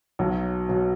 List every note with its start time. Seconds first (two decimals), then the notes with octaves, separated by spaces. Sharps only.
0.19 B1 B2 F#3
0.69 B2 F#3